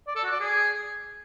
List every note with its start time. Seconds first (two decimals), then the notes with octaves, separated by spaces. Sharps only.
0.07 D5
0.15 A4
0.24 F#4
0.32 D5
0.40 G#4